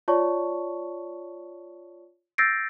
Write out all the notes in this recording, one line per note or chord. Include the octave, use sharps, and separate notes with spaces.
F4 C#5 D5 A5 C#6
E6 G6 A6 A#6 C7 D7